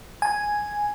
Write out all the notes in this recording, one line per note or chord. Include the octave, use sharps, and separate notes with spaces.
G#5